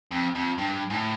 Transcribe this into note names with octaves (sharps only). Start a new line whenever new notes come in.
F2
F2
G2
G#2
A2